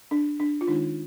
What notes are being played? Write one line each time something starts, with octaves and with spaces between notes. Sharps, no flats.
D4
D4
F4
D#3 G#3 D4 D#4